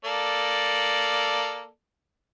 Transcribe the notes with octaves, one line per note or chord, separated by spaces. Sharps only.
A#3 A4 D5